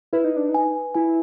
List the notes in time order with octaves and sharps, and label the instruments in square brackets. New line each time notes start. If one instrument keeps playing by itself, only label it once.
[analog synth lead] E4 [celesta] B4
[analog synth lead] D#4
D4
D#4
[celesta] G#5
[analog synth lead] E4 [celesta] G#5